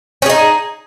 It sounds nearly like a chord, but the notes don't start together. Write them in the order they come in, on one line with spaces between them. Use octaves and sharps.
C#4 G#4 D#4